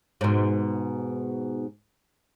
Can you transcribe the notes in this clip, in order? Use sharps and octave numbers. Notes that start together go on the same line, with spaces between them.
G#2 B2